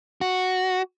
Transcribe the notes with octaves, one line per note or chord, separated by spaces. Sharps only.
F#4